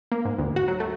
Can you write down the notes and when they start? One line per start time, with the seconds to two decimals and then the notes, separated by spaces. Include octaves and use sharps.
0.12 A#3
0.25 G#2
0.38 D2
0.56 F#4
0.68 F#3
0.80 A3